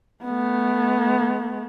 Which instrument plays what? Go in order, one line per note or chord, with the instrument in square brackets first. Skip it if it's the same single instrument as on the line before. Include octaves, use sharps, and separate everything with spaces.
[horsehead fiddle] A3 B3